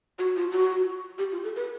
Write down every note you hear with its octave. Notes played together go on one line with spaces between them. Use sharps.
F#4
F4
F#4
G4
F4
A4
B4